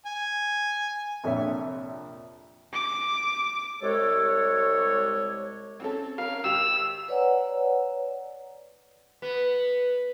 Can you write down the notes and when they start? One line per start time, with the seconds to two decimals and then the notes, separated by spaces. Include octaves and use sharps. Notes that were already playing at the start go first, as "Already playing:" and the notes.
0.06 G#5
1.24 A#1 F2 C3 D4 C#5 E5
2.73 D6
3.82 C2 G#3 G4 A4 C#5
5.80 C4 C#4 A4
6.18 C#4 A#4 F5
6.44 G#1 G4 E6 F7
7.08 B4 C#5 D5 F#5 G#5 A#5
9.22 B3